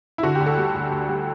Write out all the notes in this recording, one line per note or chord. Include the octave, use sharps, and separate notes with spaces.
E4
D3 F#4
G4
D2
A4
G3
D2
D2
G3